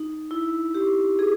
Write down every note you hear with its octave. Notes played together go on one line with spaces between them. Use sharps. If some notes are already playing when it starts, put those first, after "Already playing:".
Already playing: D#4
E4
G4
G#4